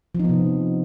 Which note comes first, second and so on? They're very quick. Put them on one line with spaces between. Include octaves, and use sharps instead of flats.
F3 D#4 B3 C3